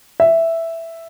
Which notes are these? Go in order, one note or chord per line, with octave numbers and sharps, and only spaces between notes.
E5